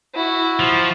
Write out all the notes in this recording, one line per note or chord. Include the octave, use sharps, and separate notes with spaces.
E4 F#4
F3